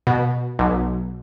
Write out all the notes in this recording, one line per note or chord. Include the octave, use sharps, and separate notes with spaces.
B2
B1